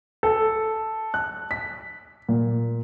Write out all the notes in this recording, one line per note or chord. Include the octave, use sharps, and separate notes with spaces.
A4
F#6
B6
A#2